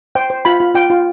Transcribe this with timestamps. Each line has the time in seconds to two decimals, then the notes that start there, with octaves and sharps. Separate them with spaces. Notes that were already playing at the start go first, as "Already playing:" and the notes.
0.15 C5 G5
0.30 C5
0.45 F4 B5
0.60 F4
0.75 F4 G5
0.90 F4